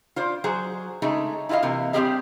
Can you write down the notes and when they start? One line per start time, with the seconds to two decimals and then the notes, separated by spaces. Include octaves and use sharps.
0.16 F4 C5 D5
0.44 F#3 G#4 C5
1.02 C#3 G#3 A3 D#4
1.49 E4 F4 G4 D#5 F5
1.62 C3 E3 A#3
1.93 G3 C4 C#4 G4 G#4 D#5